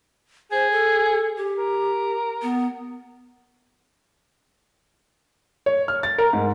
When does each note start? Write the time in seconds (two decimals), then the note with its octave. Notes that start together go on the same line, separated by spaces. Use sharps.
0.52 G#4 C5
0.71 A4
1.37 G4
1.57 A#4
2.42 B3
5.66 C#5
5.88 F6
6.03 A6
6.18 A#4
6.33 G#2